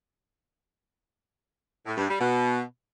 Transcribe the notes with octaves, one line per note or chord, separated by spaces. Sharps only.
A2
G2
G3
B2